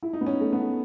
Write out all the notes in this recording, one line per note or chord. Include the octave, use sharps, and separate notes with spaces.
E4
D#4
B3
C#4
A3
B3